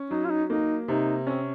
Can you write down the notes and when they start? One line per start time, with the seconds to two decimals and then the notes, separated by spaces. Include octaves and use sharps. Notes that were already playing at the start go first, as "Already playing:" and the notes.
Already playing: C#4
0.10 F#3 D#4
0.25 F4
0.30 D#4
0.50 A#3 D#4
0.88 C3 D#4
1.27 C4 C#4